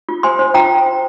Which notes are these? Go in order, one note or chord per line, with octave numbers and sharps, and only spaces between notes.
F4
C5 G#5 C6
C5
F4 G5 A#5